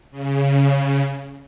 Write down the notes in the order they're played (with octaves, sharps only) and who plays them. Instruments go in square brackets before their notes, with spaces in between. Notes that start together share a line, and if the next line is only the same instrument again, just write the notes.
[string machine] C#3